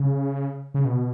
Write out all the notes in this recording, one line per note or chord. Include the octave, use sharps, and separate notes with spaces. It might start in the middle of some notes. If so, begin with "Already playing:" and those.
Already playing: C#3
C#3
B2